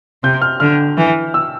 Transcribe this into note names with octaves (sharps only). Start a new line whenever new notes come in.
C3 G6
F6
D3 F6
E3
E6